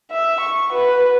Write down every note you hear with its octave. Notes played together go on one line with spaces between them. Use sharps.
E5
C#6
F#4 B4